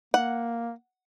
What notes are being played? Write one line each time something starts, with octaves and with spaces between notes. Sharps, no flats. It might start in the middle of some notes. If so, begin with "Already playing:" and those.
A#3 F#5